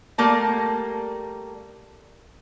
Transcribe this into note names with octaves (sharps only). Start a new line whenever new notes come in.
G3 A3 A#3 A5